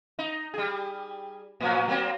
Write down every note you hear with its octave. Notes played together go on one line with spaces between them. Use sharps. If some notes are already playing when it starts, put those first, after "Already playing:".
D#4
G3 G#4
A2 F3 F#3
F#3 A#3 C4